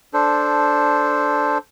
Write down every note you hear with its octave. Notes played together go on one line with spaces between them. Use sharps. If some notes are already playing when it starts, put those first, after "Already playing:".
D4 A4 C5